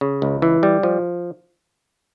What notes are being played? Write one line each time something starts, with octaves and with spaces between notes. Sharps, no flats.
C#3
C#2
E3
G3
F3